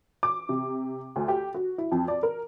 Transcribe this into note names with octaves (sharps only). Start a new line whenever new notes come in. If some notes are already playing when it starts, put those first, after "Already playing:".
D6
C3
D2
G4
F#4
E4
F2
D5
A#4